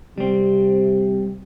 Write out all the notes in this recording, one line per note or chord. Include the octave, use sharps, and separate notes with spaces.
C3 G3 C4